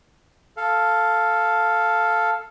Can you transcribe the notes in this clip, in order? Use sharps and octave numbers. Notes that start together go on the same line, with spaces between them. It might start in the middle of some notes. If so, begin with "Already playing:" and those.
A4 F5